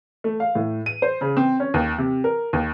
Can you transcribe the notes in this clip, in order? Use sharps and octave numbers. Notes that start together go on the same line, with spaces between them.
A3
F5
A2
D#7
C5
C#3
C4
C#4
D#2
C3
A#4
D#2